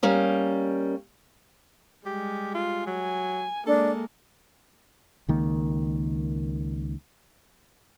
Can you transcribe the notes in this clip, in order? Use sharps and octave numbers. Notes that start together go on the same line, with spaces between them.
G3 A#3 C#4 D#5
G3 G#3 G4
F4
F#3 G#5
G#3 A#3 D4 A4
C#2 D#3 A#3